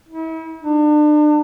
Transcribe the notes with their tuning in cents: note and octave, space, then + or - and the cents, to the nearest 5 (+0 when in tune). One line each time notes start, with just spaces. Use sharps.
E4 -40
D4 +35